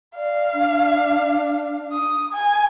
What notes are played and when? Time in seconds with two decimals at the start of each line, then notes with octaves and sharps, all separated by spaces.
0.17 D5 F5
0.54 D4
1.92 D#6
2.33 G#5